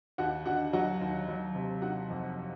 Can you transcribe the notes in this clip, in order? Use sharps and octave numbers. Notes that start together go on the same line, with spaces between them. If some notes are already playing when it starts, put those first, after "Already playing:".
D#2 F#4 F#5
D3 F#4 F#5
F#3 F#4 F#5
D#2
F#3
C3
D#3 F#4 F#5
F2